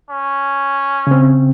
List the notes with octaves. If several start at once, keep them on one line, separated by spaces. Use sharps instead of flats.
C#4
C#3 C4